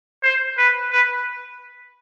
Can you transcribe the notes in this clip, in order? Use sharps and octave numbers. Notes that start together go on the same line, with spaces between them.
C5
B4
B4